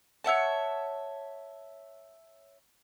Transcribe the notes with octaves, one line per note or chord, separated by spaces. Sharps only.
C#5 E5 F#5 A5